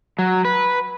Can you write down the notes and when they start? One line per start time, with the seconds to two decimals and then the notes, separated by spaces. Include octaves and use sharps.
0.19 F#3
0.45 B4